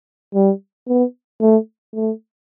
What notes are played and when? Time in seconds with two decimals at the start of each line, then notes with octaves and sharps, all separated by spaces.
0.34 G3
0.88 B3
1.41 A3
1.95 A3